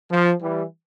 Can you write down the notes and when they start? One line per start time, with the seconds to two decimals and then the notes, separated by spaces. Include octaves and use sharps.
0.11 F3
0.41 E3 G3